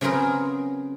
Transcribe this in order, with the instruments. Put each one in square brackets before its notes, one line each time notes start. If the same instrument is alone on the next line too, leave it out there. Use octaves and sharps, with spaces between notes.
[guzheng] C#3 F#3 B3 C4 G#4 A#4